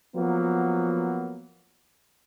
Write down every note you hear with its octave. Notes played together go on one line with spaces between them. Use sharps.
F3 F#3 A#3 B3